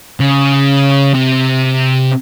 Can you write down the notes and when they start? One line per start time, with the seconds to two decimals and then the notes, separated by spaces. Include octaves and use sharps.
0.20 C#3
1.14 C3